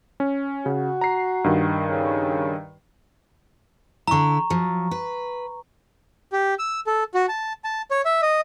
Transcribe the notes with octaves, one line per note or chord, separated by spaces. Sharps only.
C#4
C#3 F#4
A#5 C7
G2 D#3
C#3
D3 E4 A#5 C#6
F3 F#3
B4
G4
E6
A4
F#4
A5
A5
C#5
E5
D#5